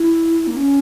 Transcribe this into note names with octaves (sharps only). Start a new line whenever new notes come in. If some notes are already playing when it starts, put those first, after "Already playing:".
Already playing: E4
A#3
C#4